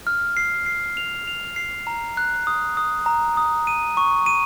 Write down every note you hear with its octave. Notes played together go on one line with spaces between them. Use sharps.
F6
C7
C7
F7
F7
C7
A#5
F#6
D#6
D#6
A#5
D#6
D#7
C#6
D#7